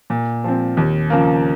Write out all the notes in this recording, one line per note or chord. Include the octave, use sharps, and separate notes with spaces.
A#2
F3 C4
D#2
C#3 F3 A#3